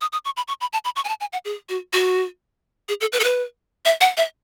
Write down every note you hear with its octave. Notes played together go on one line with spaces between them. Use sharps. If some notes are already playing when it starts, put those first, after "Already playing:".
D#6
D#6
C#6
B5
C#6
B5
A5
B5
C#6
G#5
A5
G#5
F#5
G#4
F#4
F#4
G#4
A4
B4
A4
B4
E5
F#5
E5